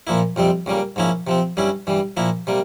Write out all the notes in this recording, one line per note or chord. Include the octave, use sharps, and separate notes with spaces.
A#2 F3 A#3 E4
F2 C3 G3 C4
C#2 C#3 G3 A#3
G#2 F3 A#3 C#4 E4
C3 F3 C4
G2 G3 C#4 E4
G2 E3 G3
A#2 F3 A#3 E4
C3 G3 A#3